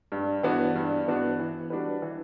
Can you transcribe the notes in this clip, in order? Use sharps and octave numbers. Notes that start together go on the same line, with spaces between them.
G2
E3 B3 D4 F#4
G2
E3 B3 D4 F#4
E3
G3 D4 F#4 B4
E3